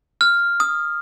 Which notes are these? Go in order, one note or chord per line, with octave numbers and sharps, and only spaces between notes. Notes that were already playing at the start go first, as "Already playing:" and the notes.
F6
D#6